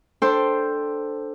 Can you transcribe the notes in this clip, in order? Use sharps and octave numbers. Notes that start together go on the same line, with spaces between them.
D4 A4 C5 G5 C6